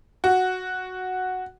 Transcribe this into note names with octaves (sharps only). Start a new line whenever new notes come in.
F#4